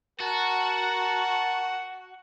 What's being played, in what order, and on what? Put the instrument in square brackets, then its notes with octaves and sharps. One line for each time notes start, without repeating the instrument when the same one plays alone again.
[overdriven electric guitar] F#4 [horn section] A#4 A5 [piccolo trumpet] F#5